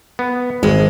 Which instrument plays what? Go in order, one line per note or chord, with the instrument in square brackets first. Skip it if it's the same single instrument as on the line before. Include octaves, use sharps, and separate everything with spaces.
[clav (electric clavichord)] B3
[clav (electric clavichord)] G#1 [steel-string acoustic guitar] G#3